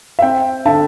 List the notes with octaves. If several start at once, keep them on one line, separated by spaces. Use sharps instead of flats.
E5
C4 G5
D3 E5 A5